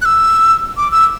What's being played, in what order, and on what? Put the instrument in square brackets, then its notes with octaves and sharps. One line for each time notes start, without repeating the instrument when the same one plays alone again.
[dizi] F#6
E6
D6
E6